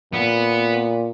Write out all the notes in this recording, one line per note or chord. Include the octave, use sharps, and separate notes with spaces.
A#2 B3